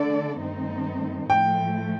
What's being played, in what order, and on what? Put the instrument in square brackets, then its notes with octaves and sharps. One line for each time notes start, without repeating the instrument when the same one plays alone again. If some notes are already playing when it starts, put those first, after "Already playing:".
Already playing: [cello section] D3 A3 D4 A4 D5
G2 D#3 A3 C4 D#4
[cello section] A2 F3 A3 [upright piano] G5